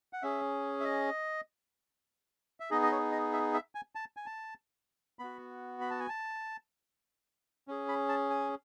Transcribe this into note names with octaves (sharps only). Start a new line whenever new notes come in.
F#5
C#4 G#4 E5
E5
D#5
E5
B3 D#4 G#4 D#5
D#5
C#5
D#5
E5
E5
G#5
A5
G#5
A5
B3 F#4 B5
B5
A5
G#5
A5
C#4 G#4
B5
A5
G#5